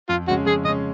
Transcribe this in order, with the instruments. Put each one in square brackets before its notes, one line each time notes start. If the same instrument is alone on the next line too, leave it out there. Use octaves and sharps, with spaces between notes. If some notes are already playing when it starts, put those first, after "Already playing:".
[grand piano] F2 [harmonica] F4
[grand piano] C#3 G#3 C#4 [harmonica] F#4
[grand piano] F2 [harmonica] G#4
[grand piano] C#3 G#3 C#4 [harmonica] D#5